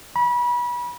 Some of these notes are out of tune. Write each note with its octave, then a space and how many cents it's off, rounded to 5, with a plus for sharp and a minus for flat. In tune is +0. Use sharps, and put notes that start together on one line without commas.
B5 -30